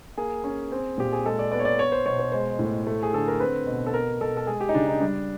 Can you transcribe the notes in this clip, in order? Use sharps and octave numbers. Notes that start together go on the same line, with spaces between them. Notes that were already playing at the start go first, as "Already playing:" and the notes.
A#3 G#4
C#4
C4
A#2 G4
G#4
G#3 A4
D5
B3 D5
C#5
D5
B3 C#5
C5
B2 C#5
C5
G#3 C5
A2
A3
G#4
D3 A4
A#4
C4 B4
B2
A4
B3 A#4
B2 A4
A4
G#3 G#4
G4
D#4
C#3 D4
D#4
G3 D4